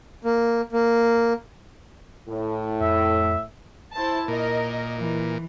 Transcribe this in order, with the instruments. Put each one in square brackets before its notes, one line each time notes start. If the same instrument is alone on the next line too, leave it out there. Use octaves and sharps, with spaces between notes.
[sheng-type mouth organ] A#3
A#3
[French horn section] A2
[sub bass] F2 [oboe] E5
[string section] E4 C5 A5
[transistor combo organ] A#2 [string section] A#4 D#5
[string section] E3